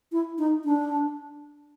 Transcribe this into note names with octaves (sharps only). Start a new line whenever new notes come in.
E4
D#4
D4